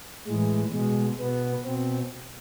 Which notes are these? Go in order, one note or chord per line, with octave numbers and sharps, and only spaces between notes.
A2 E3 G#3
B2 G#3
B2 B3
B2 C4